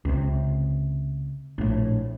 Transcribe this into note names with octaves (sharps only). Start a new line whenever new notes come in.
C#2 C3
A#1 A2